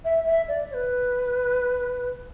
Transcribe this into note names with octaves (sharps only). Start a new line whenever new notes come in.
E5
E5
D5
C#5
B4